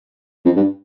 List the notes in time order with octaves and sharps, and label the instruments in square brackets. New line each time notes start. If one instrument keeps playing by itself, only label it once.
[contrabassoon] F2
G2